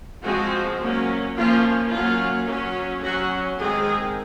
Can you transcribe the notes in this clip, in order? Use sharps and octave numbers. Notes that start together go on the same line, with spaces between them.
F3 G#3 C4 F#4
F#3 A#3 C#4
F3 A#3 C#4 F4
F#3 A#3 C#4 F4
F#3 C#4
F#3 C#4 F#4
D#3 G#3 C4 G#4